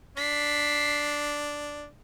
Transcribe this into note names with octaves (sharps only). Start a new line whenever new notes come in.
D4 B6 C7